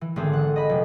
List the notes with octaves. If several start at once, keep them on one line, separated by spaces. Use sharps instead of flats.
E3
G#1 D3 C4 G#4 A4
F#5
D#5 B5
F1